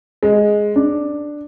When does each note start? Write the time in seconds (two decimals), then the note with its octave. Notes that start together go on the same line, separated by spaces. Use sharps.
0.23 G#3
0.76 D4